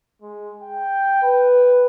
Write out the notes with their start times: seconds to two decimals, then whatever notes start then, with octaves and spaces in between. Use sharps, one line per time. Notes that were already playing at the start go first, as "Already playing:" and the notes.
0.22 G#3
0.62 G5
1.23 B4